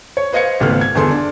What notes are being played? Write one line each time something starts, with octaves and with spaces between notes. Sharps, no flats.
C#5
B4 C5 D#5 F5 G#6 C#7
G#1 C#2 A3 B3 B4 F6
G#6
G1 E2 G#4 A4 C6
D4